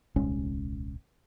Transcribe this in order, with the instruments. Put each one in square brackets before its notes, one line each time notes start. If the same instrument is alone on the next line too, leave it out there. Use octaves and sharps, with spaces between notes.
[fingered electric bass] D#1 C2 G#3 C#4